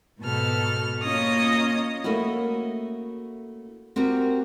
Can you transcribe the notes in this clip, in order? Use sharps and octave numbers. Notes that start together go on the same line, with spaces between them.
G#2 B2 A4 F6
A#3 C#4 F4 D#5 D#6
A3 A#3 C#4 E4 F#4
C4 F#4 G4 A#4